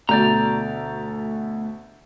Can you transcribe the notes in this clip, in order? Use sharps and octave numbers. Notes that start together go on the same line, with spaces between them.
D2 B2 A3 D5 A#5 G6 A6